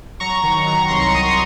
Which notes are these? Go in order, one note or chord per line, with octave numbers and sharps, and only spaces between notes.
F#3 A#5 C#6
D#3
F#3 A#5 C#6
C2 C6
C#6
F#3 C6 D#6